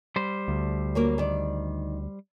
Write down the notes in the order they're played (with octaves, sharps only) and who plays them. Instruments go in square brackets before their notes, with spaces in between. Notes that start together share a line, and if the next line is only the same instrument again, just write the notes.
[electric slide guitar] G3 C5
[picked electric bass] D2
[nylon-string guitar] F#3 A#3 A#4
D#3 D5